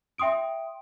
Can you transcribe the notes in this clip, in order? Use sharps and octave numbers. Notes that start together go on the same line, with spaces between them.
E5 G5 C6 D#6 D7